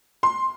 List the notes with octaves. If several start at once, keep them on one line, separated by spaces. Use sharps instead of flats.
C6